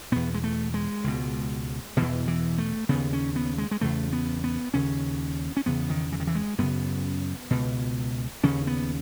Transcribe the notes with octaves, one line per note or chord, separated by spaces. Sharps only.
E2 B2 B3
G#3
A3
G#3
C#2 B2
E2 B2 E3
E3
A3
D#2 C#3 B3
C#4
B3
G#3
G#3
E2 C#3 A3
B3
B3
D#2 C#3 C#4
C#4
E2 C#3 B3
D#3
E3
D#3
E3
G#3
F#2 C#3 B3
C#2 B2
D#2 C#3 C#4
B3